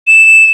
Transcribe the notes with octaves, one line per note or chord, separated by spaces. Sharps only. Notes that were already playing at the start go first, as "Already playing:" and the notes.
E7